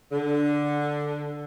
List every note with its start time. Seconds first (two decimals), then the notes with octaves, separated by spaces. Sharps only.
0.12 D3